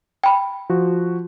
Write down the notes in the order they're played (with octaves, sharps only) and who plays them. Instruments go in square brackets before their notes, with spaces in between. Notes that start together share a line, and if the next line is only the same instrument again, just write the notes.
[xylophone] G5 B5
[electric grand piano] F3 F#4